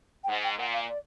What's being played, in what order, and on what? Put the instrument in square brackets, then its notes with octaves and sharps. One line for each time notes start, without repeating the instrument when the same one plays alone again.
[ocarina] G5
[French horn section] G#2 [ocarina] F#5
[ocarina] G5
[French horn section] A#2 [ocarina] F#5
[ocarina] F5
D5